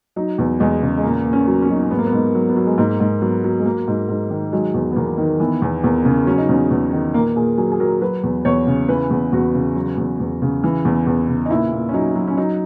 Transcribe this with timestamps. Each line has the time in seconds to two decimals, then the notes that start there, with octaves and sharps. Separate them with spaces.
0.16 F#3 D#4
0.38 E2
0.60 E2 G#3
0.82 C#3
0.97 G#3
1.04 A#2 A#3
1.25 A#2
1.33 C#4
1.47 F#3
1.62 C#4
1.69 F#3 D#4
1.80 C#4
1.91 G#2 B3
1.99 A#3
2.07 B3
2.13 G#2
2.35 F#3
2.49 B3
2.56 F#3
2.67 G#3
2.78 G#2 A#3
3.00 G#2
3.21 F#3 B3
3.44 F#3
3.60 G#3
3.65 F#3 A#3
3.88 G#2
4.09 G#2
4.30 D#3
4.52 F#3 G#3
4.74 E2
4.91 B3
4.96 E2 A#3
5.18 D#3
5.40 E3 B3
5.62 E2
5.84 E2 A#3
6.05 C#3
6.27 F#3 C#4
6.38 D#4
6.49 E2 C#4
6.71 E2
6.92 D#3
7.14 A#2 A#3
7.36 A#2 G#4
7.57 F#3 G#4
7.72 G#4
7.80 F#3 A#4
8.01 F#3 B4
8.23 E2
8.45 E2 C#5
8.67 C#3
8.89 E3 B4
9.11 E2
9.32 E2 F#4
9.54 C#3
9.76 F#3
9.98 E2
10.20 E2
10.42 C#3
10.64 E3
10.85 E2
11.07 E2
11.28 C#3
11.46 D#4
11.50 A#2 E4
11.73 A#2
11.89 C#4
11.94 F#3 D#4
12.16 F#3
12.27 C#4
12.37 F#3 D#4